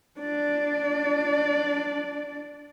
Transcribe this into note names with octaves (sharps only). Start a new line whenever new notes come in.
D4 D5